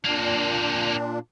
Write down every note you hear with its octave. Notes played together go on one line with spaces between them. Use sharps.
A#2 A#3 C4 D4